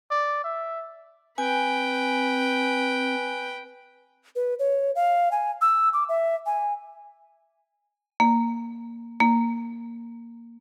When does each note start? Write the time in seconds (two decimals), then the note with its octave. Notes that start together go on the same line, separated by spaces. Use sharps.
0.11 D5
0.44 E5
1.38 C4 B4 G5 G#5
4.36 B4
4.59 C#5
4.95 F5
5.32 G#5
5.61 E6
5.93 D6
6.09 E5
6.46 G#5
8.20 A#3
9.20 A#3